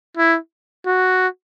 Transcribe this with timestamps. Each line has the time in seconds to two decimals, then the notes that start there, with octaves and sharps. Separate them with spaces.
0.17 E4
0.86 F#4